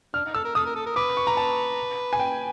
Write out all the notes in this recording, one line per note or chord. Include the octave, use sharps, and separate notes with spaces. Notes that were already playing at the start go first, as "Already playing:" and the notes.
D4 F6
D#4
A4 E6
A#4
A4 D#6
A#4
A4
A#4
B4 D6
C#6
A#5
A5
G#5
G5